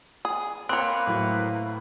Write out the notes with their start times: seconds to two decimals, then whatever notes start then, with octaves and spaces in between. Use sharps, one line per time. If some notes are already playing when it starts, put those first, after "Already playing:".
0.25 G#4
0.69 A#3 C4 B4 C#5 F5 D6 F#6
1.07 A2 F#3 E4